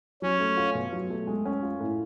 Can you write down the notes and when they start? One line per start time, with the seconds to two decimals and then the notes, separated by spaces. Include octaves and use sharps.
0.22 F#3 C#4
0.40 A3
0.57 F4
0.75 B2
0.93 F#3
1.10 A3
1.27 G#3
1.45 C#4
1.63 F4
1.80 A2